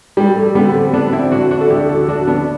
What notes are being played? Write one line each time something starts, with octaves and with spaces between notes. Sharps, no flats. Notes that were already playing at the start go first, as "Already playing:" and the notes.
G2 G3
A3
D3 G3 B3
A3 C4
D3 B3 D4
C4 E4
D3 D4 F#4
D4 F#4
A4
D2 E4 G4
F#4 A4
D2 D4 F#4
B3 D4